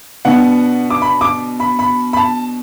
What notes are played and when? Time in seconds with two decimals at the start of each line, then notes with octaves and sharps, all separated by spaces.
0.25 B2 B3 D4 F#5
0.90 D6
1.02 B5
1.21 D6
1.60 B5
1.79 B5
2.13 B5
2.17 A5